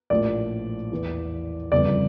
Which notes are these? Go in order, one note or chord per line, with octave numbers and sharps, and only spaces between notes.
A#1 A2 F3 D5
E2 E3
G1 F2 C#3 E3 D5